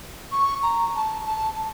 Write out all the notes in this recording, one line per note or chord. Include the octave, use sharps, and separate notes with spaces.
C#6
A#5
A5
A5